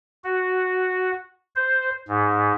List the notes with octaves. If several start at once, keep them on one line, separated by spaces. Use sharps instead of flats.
F#4
C5
G#2